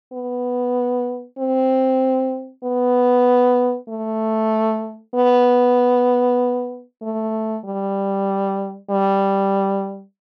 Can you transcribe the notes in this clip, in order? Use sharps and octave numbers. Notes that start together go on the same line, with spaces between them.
B3
C4
B3
A3
B3
A3
G3
G3